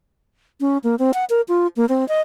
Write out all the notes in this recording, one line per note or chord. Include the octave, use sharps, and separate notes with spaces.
C#4
A#3
C4
F#5
A#4
F4
A#3
C4
D#5